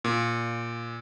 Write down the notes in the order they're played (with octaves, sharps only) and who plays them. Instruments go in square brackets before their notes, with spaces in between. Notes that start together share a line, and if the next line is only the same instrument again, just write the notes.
[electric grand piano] A#2